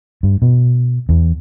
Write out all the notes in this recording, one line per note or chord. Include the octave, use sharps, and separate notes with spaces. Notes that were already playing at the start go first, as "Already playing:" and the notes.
G2
B2
E2